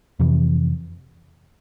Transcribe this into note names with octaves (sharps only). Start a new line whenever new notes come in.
F2 C3 E3